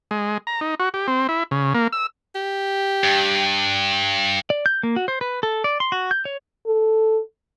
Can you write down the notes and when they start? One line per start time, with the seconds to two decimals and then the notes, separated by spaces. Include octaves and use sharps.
0.11 G#3
0.47 A#5
0.61 D#4
0.80 F#4
0.94 G4
1.08 C4
1.29 E4
1.51 C#3
1.74 A#3
1.93 E6
2.35 G4
3.04 G2
4.50 D5
4.66 G6
4.83 A#3
4.96 F#4
5.08 C5
5.21 B4
5.43 A4
5.64 D5
5.80 C6
5.92 F#4
6.11 G6
6.25 C#5
6.67 A4